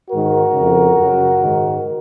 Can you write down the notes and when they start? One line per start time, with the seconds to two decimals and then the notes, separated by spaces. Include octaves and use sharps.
0.10 G#2 D#3 F#4 A#4
0.54 F2 C#3
0.97 F#2 C#3
1.41 G#2 D#3